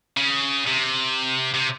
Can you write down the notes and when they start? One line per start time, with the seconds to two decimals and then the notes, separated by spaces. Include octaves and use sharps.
0.17 C#3
0.67 C3
1.54 C3